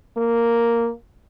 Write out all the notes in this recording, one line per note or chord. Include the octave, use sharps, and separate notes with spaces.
A#3